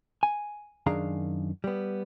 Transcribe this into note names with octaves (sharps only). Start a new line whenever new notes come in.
G#5
F#2 D#3 D4 G#4 F5 A#5
G3 B3